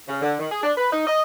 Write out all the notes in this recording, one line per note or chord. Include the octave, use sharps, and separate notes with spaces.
C#3
D3
D#3
G#4
D4
B4
D#4
D#5